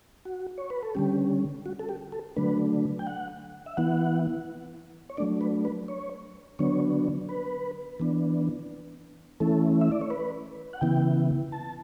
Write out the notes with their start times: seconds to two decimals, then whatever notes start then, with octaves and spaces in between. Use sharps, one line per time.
0.25 F#4
0.58 C#5
0.70 B4
0.83 A4
0.95 D3 G3 C#4 G4
1.66 F#4
1.79 A4
1.89 G4
2.12 A4
2.36 D3 F#3 A3 D4 B4
2.99 G5
3.07 F#5
3.66 E5
3.77 E3 B3 E4 F#5
5.10 C#5
5.17 F#3 A3 D4 D5
5.41 B4
5.65 B4
5.88 C#5
6.59 D3 F#3 B3 D4 C#5
7.29 B4
8.00 E3 B3 D4
9.40 E3 A3 C#4 E4 A4
9.81 E5
9.92 D5
10.01 C#5
10.10 B4
10.73 F#5
10.81 C#3 E3 B3 E4 G5
11.52 A5